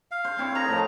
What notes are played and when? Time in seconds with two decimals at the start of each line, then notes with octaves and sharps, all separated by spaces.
0.11 F5
0.24 C5
0.38 C4 E4 C#5
0.55 D#4 A#4 B4 A#5
0.68 A2 F3